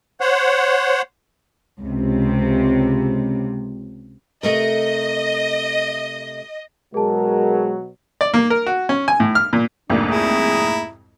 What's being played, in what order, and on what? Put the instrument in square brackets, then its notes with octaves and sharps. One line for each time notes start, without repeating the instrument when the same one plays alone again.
[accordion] C5 C#5 F#5
[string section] C#2 C3
[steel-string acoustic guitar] C3 A3 A#4 [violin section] D#5
[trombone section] B2 F#3 [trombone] G#3 [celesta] G#4 A5 [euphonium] A#4
[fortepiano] D5
A#3
A#4
F#4
C#4
G#5
A2
F6
A#2
[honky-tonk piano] C2 F2 G#2 [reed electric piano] A3 A#3 [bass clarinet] D4
[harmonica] E4 A#5 [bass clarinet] G#4